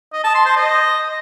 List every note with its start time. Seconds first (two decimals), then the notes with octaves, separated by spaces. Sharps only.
0.13 D#5
0.24 A5
0.35 C6
0.45 C5
0.56 D#5